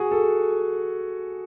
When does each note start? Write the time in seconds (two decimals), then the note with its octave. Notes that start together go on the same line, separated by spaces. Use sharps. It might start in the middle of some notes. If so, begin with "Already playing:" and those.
Already playing: F#4 G#4
0.11 A4